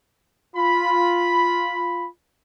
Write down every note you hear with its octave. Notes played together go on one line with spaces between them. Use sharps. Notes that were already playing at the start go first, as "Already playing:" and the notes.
F4 B5